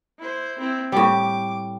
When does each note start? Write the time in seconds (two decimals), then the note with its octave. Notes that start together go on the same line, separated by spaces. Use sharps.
0.18 E4 C5
0.58 C4 E4
0.92 A2 G3 D6